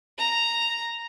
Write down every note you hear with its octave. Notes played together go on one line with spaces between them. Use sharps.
A#5